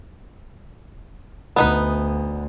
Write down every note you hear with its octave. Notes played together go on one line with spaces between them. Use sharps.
D2 B3 D#4 B4